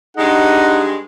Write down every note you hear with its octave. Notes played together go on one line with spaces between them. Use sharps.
G2 G#3 D4 D#4 G4 G#4 F#5